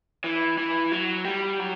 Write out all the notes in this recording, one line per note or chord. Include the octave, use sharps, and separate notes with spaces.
E3
E3
F#3
G3
F#3